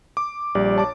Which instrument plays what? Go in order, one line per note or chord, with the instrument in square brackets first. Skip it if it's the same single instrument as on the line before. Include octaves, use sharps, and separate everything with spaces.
[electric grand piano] D6
[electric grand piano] A#1 [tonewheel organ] G3 D5
[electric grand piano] C#5 A5 D6